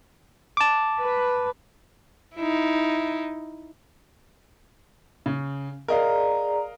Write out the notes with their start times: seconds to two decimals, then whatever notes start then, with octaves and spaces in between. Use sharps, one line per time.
0.57 A5 D6
0.99 B4
2.36 D#4 E4
5.26 C#3
5.88 G#4 A#4 D5 D#5 F5 A#5